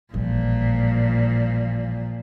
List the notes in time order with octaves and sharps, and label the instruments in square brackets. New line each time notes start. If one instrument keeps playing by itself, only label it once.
[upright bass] A1 G3 [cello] A#2 F3